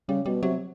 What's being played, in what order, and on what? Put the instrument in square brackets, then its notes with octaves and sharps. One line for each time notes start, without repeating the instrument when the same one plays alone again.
[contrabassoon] C#3 [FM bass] G3
[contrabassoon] B2 [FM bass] G3
[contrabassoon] C3 [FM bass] F#3